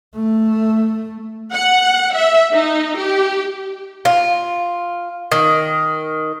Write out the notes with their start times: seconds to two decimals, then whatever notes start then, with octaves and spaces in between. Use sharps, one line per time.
0.15 A3
1.52 F#5
2.14 E5
2.53 D#4
2.98 G4
4.05 F4
5.32 D#3